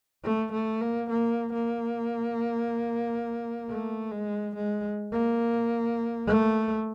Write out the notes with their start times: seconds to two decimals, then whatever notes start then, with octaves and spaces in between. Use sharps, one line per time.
0.24 A3
0.53 A3
0.81 A#3
1.10 A#3
1.53 A#3
3.69 A3
4.11 G#3
4.55 G#3
5.12 A#3
6.27 A3